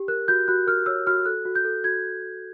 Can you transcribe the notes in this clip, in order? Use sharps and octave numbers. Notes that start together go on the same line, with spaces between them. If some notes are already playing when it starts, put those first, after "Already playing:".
Already playing: G4
A#4 F#6
F#4 G6
F#4 F#6
A#4 F6
C#5 E6
F#4 F6
A4 F#6
F#4
G6
A4
F#4 G#6